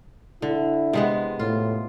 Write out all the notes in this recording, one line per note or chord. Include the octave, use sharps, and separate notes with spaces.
D3 E4
C3 G#3 B3
A2 F4